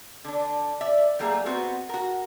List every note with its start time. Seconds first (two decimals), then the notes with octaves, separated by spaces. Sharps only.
0.25 D3 D4
0.81 D5 E5
1.19 F#3 G3 A3 A#3 G#4
1.46 B3 C4 F#4
1.89 F#4 A#4